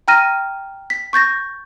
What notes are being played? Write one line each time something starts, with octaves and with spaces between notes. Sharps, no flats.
G5 A#5 F6 A#6 D#7
B6
C#6 G6 A6 A#6